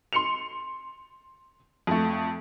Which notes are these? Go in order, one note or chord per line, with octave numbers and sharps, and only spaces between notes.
C6 C#7 F7
F2 A3